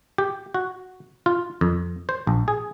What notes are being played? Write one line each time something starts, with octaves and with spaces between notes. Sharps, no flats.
G4
F#4
F4
F2
C5
A#1
G#4